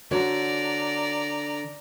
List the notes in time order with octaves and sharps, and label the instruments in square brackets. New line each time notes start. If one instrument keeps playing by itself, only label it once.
[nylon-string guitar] D3 F#4 C#5 [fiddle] D5 A#5